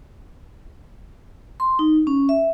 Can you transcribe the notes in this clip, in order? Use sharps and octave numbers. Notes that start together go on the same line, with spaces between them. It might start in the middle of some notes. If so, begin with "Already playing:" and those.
C6
D#4
C#4
E5